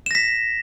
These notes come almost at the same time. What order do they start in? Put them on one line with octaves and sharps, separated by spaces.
E7 A#6 B6